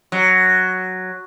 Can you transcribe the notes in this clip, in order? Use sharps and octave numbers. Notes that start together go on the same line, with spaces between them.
F#3